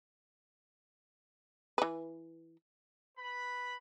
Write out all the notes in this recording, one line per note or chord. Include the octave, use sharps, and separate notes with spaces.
E3 B4
B4 B5